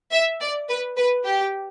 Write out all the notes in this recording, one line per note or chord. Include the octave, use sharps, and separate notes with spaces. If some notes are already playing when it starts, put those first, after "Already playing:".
E5
D5
B4
B4
G4